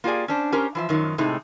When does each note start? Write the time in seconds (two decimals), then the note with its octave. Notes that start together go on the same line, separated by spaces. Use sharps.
0.04 A#3 F4 G4 G#4 D5 G#5
0.28 C#4 D4 C5
0.52 C#4 G4 A#4 C5 A#5
0.75 E3 F3 E5
0.89 F#2 D#3 F3 F#3
1.18 A2 C3 G#3 A3 D#4